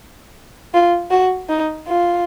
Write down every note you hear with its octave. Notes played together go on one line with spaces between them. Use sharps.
F4
F#4
D#4
F4